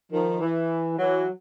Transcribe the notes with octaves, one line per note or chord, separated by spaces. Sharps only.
D#3 F3
E3
E3 F#3